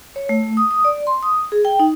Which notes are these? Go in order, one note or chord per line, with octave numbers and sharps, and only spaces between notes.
C#5
A3
D#6
D#6
D5
C6
D#6
G#4
G5
D#4